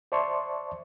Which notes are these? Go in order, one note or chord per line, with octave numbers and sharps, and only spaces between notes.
C5 D5 E5 A5 C6 C#6